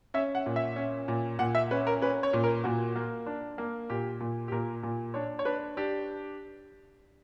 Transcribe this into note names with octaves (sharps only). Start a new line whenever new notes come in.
C#4 E5
F#5
A#2
E5
C#4
A#2
A#2 F#5
E5
C#4 B4
A#4
C#4 B4
C#5
A#2
A#4
A#2 F#4
A#3
D4
A#3
A#2 G4
A#2
G4
A#2 A#4
A#2
D4 C#5
C#5
D4 B4
D4 G4